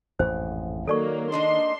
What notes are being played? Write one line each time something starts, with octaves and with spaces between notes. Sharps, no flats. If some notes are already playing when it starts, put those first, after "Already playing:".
A1 F2 G#2 C5
D#3 F#3 A#3 A4 D5 C#6
A#3 D4 D#4 D#5 C6